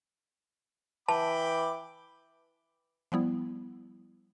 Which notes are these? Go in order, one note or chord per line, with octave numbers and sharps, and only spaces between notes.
E3 G5 A5 B5 D6
F3 G3 B3 E4